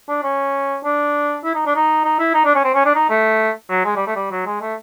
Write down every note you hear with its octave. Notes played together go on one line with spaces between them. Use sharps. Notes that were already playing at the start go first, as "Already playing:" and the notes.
D4
C#4
D4
E4
D#4
D4
D#4
D#4
E4
D#4
D4
C#4
C4
C#4
D4
D#4
A3
F#3
G#3
G3
A3
G3
F#3
G#3
A3